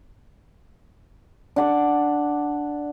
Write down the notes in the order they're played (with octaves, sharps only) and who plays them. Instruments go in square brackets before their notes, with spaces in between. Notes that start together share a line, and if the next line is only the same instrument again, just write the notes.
[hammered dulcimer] D4 F#5 D6